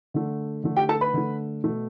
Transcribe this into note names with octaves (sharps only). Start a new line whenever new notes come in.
D3 A3
D3 A3
G4 G5
A4 A5
B4 B5
D3 A3
B2 A3